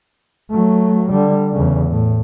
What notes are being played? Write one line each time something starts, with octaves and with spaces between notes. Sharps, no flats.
F#3 A3
D3 G3
E2 C#3
A2